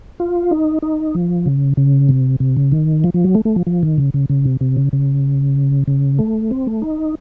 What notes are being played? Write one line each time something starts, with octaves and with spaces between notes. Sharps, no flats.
F4
D#4
D#4
F3
C#3
C#3
C3
C3
C#3
D#3
F3
F3
F#3
A3
A3
F3
F3
D#3
C#3
C#3
C#3
C3
C3
C#3
C#3
C#3
A3
C4
A3
D#4